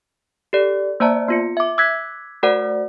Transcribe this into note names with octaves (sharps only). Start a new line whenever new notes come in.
G4 A4 D5
A#3 C5 D5 E5 A5 A#5
B3 F4 C#7
E5 D6
D6 E6 F#6 G#6 B6
A3 F#4 A#4 C5 D5 F#5